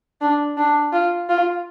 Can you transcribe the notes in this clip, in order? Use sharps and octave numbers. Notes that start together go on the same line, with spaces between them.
D4
D4
F4
F4